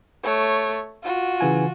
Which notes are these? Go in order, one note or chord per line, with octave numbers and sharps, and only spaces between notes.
A3 C#5
F4 F#4
C#3 E3 G#5